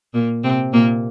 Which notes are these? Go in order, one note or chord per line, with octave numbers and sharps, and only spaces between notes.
A#2 A#3
C3 C4
A#2 A#3